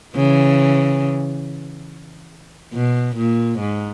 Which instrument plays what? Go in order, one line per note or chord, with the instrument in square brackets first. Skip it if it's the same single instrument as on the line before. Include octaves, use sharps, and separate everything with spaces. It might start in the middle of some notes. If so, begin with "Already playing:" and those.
[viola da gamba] C#3 E3
B2
A#2
G#2